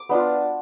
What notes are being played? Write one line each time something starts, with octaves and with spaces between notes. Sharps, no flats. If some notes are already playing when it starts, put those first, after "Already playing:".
Already playing: D6
B3 D4 F4